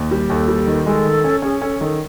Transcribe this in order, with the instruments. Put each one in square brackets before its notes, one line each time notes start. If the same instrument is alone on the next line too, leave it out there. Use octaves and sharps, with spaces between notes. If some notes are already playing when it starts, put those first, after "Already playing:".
Already playing: [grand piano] D#2
G3
[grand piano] D#2 [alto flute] A4
[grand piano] G3
D#3
[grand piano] G#3 [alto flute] A4
[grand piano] D#3
C#4
[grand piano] C#4 [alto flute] G#4
[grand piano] C#4 [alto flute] A4
[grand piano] D#3 [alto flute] A4